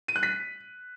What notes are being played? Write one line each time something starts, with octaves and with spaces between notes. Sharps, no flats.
D#7
F#6
B6